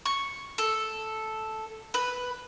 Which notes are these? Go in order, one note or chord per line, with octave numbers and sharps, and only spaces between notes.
C#6
A4
B4